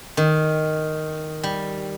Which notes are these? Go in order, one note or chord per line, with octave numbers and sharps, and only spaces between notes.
D#3
G3